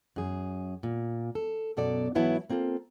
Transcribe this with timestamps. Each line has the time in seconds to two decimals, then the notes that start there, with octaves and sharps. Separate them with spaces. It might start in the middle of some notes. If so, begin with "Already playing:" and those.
0.16 F#2 G#4
0.83 A#2
1.35 A4
1.77 F#2 B2 A4 D5
2.15 G#2 E3 F#3 B3 E4 A5
2.50 A#3 C4 F4 A4